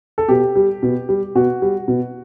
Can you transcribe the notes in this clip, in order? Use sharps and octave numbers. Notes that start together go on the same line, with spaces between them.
A4
B2 G4
G3
B2
G3
B2 F#4
G3
B2